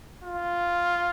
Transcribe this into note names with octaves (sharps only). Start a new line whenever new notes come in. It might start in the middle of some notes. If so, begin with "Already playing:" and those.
F4